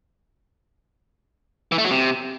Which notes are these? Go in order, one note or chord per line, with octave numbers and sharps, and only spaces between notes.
E3
A3
F#3
C3